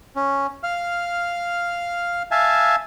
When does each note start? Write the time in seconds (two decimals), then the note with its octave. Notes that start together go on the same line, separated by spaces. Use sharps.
0.16 C#4
0.63 F5 F6
2.31 E5 F5 G#5 A5